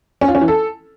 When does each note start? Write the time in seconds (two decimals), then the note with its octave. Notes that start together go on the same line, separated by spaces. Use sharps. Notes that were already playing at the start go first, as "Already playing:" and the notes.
0.21 C#4
0.28 F4
0.35 C#4
0.41 E3
0.48 A4